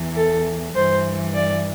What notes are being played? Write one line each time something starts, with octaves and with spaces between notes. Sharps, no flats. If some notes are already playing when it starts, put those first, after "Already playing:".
Already playing: E2 E3
A4
G2 E3 C5
D5